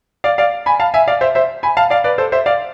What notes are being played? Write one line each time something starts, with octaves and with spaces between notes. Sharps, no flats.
D5 F5
D5 F5
G#5 B5
F5 A5
E5 G#5
D5 F5
C5 E5
C5 E5
G#5 B5
F5 A5
D5 F5
B4 D5
A4 C5
C5 E5
D5 F5